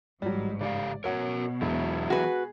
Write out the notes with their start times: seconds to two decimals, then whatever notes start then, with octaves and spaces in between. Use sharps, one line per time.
0.22 A1 G#2 F#3 G3
0.61 C#3 G4 D5 F5
1.04 B2 F#4 A#4 C#5 F#5
1.61 E1 E2 F#3 E4
2.10 F#4 G#4 B4